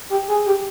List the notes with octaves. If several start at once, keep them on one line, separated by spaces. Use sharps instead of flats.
G4
G#4
G4